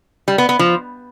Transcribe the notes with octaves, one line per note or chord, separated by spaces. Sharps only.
G3
B3
B3
F3